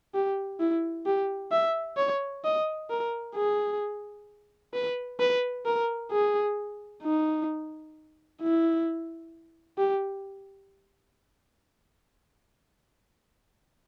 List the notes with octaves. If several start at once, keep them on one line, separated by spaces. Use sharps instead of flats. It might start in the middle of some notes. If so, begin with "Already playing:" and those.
G4
E4
G4
E5
C#5
D#5
A#4
G#4
B4
B4
A#4
G#4
D#4
E4
G4